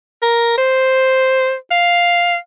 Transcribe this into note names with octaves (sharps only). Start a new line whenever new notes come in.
A#4
C5
F5